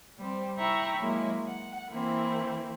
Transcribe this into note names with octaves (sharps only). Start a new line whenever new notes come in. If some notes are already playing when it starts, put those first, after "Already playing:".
G3 C4
E4 E5 G5 A#5 B5 C#6
F#3 G#3 A#3 E4
F#5
E3 A#3 C4 E4